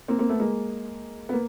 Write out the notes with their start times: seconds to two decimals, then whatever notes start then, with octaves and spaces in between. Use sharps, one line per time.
0.08 A#3 C4
0.19 A#3 C4
0.29 A3 B3
0.40 G#3 A#3
1.29 B3
1.33 A#3